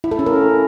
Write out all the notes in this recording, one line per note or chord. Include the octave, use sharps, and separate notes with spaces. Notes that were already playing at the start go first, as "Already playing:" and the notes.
E4
A4
C#4
A#4